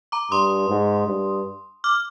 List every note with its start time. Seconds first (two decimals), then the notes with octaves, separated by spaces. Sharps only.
0.12 A#5 D6
0.31 G2 C6 D#6
0.69 G#2
1.07 G2
1.84 D6 F6